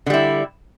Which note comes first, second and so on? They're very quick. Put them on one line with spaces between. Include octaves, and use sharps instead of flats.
D3 G3 E4